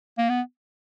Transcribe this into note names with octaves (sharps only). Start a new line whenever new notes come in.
A#3
B3